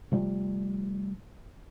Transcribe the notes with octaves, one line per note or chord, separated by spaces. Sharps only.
C3 F3 G3 A3